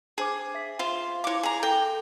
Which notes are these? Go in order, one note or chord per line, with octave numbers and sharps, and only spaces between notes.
D4 G#4 C5 D6
E5 B6
F4 C5
E4 C#5 F5 D6
G#4 A#5
A4 G5